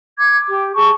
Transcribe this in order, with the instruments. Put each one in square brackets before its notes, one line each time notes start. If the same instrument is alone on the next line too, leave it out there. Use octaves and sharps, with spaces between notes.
[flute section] D6 G#6
G4
G#4 A5 C#6